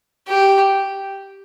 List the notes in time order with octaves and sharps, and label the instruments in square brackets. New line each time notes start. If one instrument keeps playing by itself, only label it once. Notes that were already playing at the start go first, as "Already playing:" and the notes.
[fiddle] G4